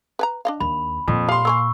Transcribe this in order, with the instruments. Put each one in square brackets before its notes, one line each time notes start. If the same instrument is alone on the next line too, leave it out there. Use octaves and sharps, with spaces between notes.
[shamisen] B4 G#5 A#5
D4 D#5 F5
[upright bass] D#2 [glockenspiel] B5
[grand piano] F2 [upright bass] A#2
[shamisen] G3 [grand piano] F5 C6
[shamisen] A#3 A#4 G#5 [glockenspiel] C#6 E6